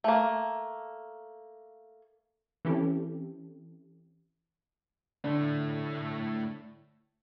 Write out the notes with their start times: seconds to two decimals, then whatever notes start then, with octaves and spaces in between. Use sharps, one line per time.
0.04 A3 A#3
2.65 E3 C4 C#4 E4 G4 A4
5.24 A2 D3 A3